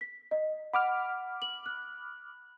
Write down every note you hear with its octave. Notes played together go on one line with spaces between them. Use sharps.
B6
D#5
F#5 B5 D6 F6
F#7
F#6